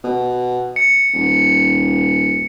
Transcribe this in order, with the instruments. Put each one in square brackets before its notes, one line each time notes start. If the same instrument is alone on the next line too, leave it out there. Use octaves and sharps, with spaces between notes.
[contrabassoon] B2
[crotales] C#7
[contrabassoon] D#1